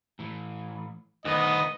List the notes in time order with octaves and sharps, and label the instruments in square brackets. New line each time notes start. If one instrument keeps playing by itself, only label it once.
[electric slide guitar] A2 E3
[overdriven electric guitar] D2 B3 [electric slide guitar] D#3 [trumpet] D#5